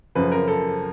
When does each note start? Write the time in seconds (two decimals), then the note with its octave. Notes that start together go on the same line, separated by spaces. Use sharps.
0.15 F#2 C#3 F3 B4
0.32 A#4
0.48 A4